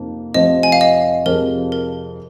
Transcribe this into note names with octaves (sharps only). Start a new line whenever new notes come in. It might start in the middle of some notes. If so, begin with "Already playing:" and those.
Already playing: F2 C3 F3 A#3 D#4
F1 F2 C3 F3 C4 D#5
G#5
F5
D#5
F2 C3 F3 G#3 A#4
A#4